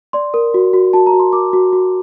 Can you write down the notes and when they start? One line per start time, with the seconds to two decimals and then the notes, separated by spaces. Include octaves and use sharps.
0.13 D5 C6
0.34 A#4
0.54 F#4
0.73 F#4
0.93 F#4 A5
1.07 A#5
1.13 F#4
1.20 C6
1.33 A#4 D6
1.53 F#4
1.73 F#4